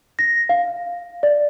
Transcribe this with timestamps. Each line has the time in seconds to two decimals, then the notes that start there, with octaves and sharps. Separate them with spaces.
0.19 A#6
0.49 F5
1.23 D5